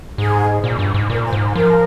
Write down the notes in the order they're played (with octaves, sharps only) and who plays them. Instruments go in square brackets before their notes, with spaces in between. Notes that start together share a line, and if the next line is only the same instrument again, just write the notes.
[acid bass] G#2 [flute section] G#4
[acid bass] A#2
G2
G#2
[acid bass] A#2 [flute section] A#4
[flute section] C5
[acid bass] G#2
[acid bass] F3 [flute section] A#4